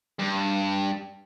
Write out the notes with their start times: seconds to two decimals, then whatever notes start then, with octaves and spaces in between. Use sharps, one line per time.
0.19 G2